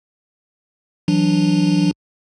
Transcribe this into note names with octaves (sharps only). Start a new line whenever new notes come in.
E3 F#3 D4